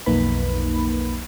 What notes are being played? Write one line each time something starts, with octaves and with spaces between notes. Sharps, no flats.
B1 F2 A#3 D#4 B4 B5